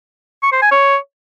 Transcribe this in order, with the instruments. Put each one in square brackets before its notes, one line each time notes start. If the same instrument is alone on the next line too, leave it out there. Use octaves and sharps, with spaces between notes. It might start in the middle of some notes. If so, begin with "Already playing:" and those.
[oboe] C#6
C5
G#5
C#5